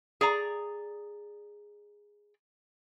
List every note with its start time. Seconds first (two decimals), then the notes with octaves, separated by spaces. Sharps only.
0.21 G#4 D5 A#5